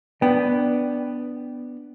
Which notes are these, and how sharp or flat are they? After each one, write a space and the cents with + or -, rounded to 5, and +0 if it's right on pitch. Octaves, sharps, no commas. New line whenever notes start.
B3 +0 D4 +0 G5 +0